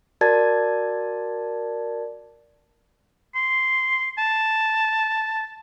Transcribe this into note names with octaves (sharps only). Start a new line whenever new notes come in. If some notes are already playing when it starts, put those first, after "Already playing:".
F#4 A#4 D5 A5 G#6 A6
C6
A5